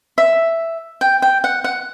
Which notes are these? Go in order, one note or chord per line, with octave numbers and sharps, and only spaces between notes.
E5
G5
G5
F#5
F#5